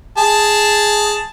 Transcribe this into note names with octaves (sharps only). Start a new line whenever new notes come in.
G#4 A5